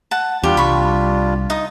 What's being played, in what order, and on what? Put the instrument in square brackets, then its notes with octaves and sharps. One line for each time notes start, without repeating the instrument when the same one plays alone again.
[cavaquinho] F#5 A5
[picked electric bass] E2 [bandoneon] G3 D4 F4 [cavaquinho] G4
[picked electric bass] C2 [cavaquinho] B5 C#6
[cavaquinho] D#4 D#6